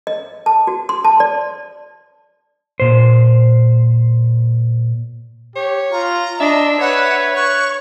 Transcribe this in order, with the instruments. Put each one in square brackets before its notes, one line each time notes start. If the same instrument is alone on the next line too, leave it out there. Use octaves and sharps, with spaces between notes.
[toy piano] D#5
A5
F#4
C6
A5
D5
[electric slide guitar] A#2 C5
[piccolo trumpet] G4 [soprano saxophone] C#5
[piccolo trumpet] F4 [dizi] A#5
[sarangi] D4 [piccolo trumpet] D#5 [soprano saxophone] E5
[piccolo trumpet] B4 [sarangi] C#5 [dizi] F#5
[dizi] C#6 [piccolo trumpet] F#6